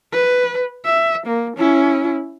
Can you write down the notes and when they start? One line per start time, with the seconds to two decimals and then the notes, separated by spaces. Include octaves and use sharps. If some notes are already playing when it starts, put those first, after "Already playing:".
0.12 B4
0.86 E5
1.27 A#3
1.58 C#4 E4